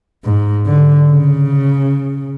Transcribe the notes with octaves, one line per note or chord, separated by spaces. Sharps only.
G#2
D3
C#3